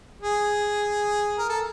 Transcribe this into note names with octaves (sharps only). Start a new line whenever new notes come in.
G#4
A#4
A4